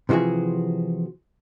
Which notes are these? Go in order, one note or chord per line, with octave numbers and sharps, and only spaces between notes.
C3 E3 F3 F#4 G#4